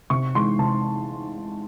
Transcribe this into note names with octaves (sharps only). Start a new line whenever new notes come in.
C3 C#6
E3 G#3 C6
C3 A5